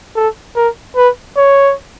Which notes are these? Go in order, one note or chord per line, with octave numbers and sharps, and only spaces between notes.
A4
A#4
B4
C#5